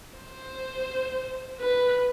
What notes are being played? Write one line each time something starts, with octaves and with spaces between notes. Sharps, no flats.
C5
B4